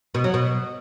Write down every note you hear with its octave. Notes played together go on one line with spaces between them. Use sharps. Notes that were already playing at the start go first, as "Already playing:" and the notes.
B2
F#3
B2